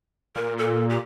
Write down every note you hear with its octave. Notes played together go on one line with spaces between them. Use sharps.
A#2 A#4
A4
G4